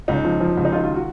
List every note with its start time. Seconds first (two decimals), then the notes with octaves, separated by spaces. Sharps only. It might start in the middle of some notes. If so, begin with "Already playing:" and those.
0.08 C#2 D#4
0.25 F3
0.41 F3
0.57 C#2
0.65 D#4
0.72 D#3 F4
0.84 F4
0.94 F#4